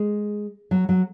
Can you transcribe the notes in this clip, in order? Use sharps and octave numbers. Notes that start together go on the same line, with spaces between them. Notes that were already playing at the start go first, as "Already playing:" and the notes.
Already playing: G#3
F#3
F#3